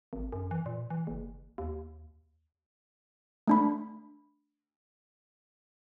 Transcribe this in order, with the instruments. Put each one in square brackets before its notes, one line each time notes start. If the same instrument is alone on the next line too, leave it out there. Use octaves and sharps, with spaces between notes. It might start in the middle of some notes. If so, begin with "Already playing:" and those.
[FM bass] G#1
F#2
E3
A#2
E3
F#1
D#2
[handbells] A3 D4 B5